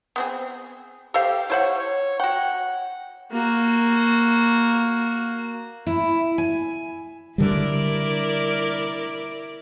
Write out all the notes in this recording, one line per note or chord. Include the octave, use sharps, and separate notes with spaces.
B3 C4 G#4
G4 A4 C5 F5
E4 C5 C#5 F#5
C#5
F#4 F#5 G5
A#3 F#4
E4
G#5
D3 G3 E4 A#4 D5